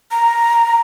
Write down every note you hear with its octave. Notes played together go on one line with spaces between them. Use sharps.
A#5